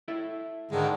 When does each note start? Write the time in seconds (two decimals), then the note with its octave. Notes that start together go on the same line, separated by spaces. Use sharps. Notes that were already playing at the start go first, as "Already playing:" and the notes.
0.08 E4 A4 E5
0.71 G#2 D3 D#3 G#3